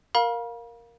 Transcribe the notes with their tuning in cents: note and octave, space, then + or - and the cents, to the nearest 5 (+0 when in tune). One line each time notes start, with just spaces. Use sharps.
A#4 +0 F5 +15 B5 -45